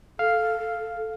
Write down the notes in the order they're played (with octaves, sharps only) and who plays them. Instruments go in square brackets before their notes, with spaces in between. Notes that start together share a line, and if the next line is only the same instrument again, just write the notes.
[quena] A4 [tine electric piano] F5